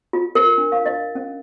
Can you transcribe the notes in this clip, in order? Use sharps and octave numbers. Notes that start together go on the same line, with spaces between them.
F4
A#4
D4
F5
D#5
C#4